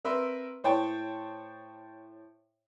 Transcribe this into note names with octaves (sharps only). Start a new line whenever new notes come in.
C4 A#4 B4 E5 C6
A2 C5 C#5 G5 A5 C#6